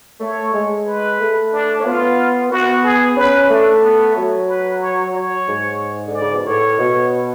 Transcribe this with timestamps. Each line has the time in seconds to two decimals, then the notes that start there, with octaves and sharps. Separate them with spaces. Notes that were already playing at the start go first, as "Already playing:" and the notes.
0.20 A3 C#5
0.53 G#3
0.87 B4
1.20 A3
1.53 D4
1.80 C#4
1.85 B3 F4
2.51 B3 F#4
2.84 G#4
3.16 C#4 B4
3.49 A3 D4
3.83 B3
4.16 F#3
4.48 B4
4.81 C#5
5.14 C#5
5.47 G#2
6.07 D3
6.14 D5
6.20 C#3
6.33 B2
6.46 A2 C#5
6.78 B2